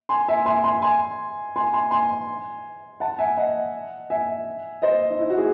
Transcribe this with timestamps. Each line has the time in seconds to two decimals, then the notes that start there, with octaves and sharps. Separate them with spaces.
0.09 G#5 C6
0.29 E5 G#5
0.46 G#5 C6
0.64 G#5 C6
0.82 G#5 C6
1.56 G#5 C6
1.73 G#5 C6
1.91 G#5 C6
3.00 F#5 A5
3.19 E5 G#5
3.37 D#5 F#5
4.10 E5 G#5
4.82 C5 D#5
5.10 D#4
5.19 E4
5.30 F#4
5.37 E4 G#4